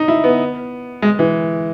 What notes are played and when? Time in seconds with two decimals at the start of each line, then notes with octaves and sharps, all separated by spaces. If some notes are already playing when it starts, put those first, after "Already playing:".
Already playing: D#4
0.08 E4
0.24 B3
1.02 G#3
1.19 E3